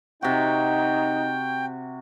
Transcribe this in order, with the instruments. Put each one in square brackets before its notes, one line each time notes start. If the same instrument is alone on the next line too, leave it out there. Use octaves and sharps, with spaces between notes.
[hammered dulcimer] C3 F#4 [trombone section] D#4 [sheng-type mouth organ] G5